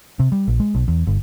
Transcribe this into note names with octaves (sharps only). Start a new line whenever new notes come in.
C3
G3
A#1
G#3
B1
E2
G1